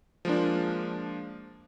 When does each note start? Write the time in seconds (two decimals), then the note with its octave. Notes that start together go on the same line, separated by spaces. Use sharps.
0.25 F3 G#3 A#3 D4